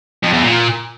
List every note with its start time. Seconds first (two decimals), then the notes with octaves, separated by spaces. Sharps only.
0.23 F2
0.33 E2
0.42 A#2